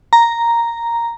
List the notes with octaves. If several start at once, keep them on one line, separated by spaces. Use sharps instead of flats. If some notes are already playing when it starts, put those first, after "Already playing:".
A#5